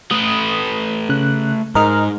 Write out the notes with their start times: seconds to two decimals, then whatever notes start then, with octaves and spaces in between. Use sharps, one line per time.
0.11 A3 B4 D#6
1.09 C#3 F#6
1.75 G#2 A#4 D#5 F6